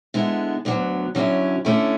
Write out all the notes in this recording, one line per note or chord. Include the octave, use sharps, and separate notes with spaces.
D3 G#3 B3 E4
D2 D3 F#3 B3
D3 F#3 C#4 E4
D3 A3 C#4 E4